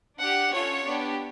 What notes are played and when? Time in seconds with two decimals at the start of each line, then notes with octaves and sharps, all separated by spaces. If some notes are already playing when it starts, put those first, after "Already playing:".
0.20 D4 G4 F#5
0.53 C#4 F4 A4 C#5
0.86 B3 D4 G4